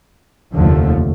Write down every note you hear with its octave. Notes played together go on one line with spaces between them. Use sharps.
F1 D#2 D3 F3 A3